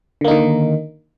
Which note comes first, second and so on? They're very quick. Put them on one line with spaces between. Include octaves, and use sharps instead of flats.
D3 A#3 D#4 D#3